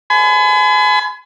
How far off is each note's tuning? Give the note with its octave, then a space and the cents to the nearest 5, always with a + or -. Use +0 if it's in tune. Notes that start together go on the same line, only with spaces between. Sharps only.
G#5 +30 B5 +40